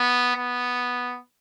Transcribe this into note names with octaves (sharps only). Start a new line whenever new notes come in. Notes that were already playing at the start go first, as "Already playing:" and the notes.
Already playing: B3
B3